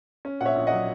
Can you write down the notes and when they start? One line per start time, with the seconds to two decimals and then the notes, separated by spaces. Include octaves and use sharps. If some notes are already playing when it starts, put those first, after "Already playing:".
0.25 C#4
0.41 A#2 F#5
0.45 C#5 E5
0.56 A#1
0.67 F#3 D#5 F#5